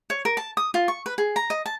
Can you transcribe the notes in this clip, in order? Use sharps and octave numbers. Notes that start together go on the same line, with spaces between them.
C#5
A#4
A5
D#6
F4
C#6
B4
G#4
A#5
D#5
A5